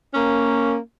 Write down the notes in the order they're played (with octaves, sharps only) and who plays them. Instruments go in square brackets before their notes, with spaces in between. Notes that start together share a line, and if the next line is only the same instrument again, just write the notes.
[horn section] A#3 C#4